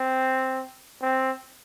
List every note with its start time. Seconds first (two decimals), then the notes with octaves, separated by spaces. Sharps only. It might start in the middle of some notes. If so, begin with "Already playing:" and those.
Already playing: C4
1.01 C4